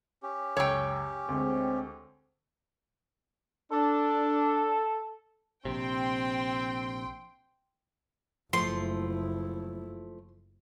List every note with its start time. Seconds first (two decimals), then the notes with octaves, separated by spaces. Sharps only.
0.23 C#4 G4
0.57 C#2 F#2 C#5 G5 E6
1.28 D2 G#3 C4
3.72 D4 A4
5.65 A#1 C3 C4 G5 C6
8.53 F#1 F3 A3 E4 C6